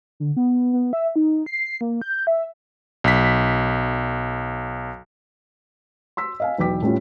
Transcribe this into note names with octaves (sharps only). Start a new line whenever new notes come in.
D3
B3
B3
E5
D#4
C7
A#3
G6
E5
B1 B6
C6 E6 B6
D#5 F5 G#5
B1 E2 B4 G5 D6 B6
A2 G3 C#4 F4